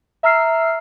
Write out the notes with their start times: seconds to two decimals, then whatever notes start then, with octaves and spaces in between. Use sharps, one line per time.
0.23 E5 A#5 E6 F6 C7